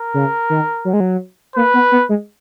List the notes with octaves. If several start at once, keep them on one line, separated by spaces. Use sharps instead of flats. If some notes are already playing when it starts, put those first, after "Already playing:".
Already playing: A#4
C#3
D#3
F#3
G#3
F#3
A#3 B4
B3
B3
G#3